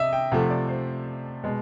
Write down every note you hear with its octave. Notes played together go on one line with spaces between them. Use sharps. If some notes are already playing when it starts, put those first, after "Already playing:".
Already playing: C3 D#5 E5
G5
C3 F3 A3 F#5
D5
C5
B2 G#3